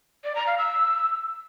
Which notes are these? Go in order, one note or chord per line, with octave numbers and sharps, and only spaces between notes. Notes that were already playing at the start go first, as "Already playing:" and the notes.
D5
A#5
F5
E6